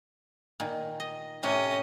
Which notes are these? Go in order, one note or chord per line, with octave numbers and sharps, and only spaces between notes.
A#2 D#3
D#5
A2 C3 C#4 G4 D#5